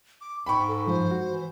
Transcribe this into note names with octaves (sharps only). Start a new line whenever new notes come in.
D6
G#2 G5 B5 C#6
A4
G2 F3 G#3 C5
F#4
E3